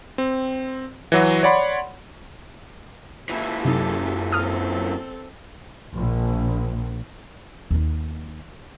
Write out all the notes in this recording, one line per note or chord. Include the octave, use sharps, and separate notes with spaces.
C4
E3 F#3 F#4
C#5 D5 F#5 B5 C6
A#2 E3 E4
F#2 C3 D#4 G4 A4
C4 A4 D#6 F6
A#1
D#2 D#4